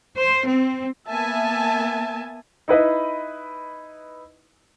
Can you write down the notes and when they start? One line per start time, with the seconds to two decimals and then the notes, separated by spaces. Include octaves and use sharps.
0.18 C5
0.49 C4
1.09 A#3 B3 E5 G#5 A5
2.68 D#4 E4 B4 D#5